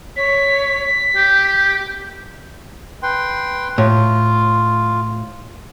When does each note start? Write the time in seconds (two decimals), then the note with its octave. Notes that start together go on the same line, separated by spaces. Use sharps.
0.17 C#5 B6
1.16 G4 G6
3.03 B4 G5 C6
3.78 A2 F4